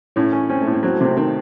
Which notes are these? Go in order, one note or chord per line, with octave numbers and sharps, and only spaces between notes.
A2 C#4
C#4
C4 C#4
A3
A2
C4
F#3 C4
A3
C3 C4
D#3 C4